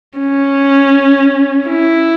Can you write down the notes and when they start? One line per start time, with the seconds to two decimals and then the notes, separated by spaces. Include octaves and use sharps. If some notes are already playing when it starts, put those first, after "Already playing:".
0.19 C#4
1.69 E4